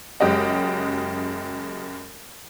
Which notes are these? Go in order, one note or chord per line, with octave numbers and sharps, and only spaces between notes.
F#1 F#2 G#3 G4 D#5 F#5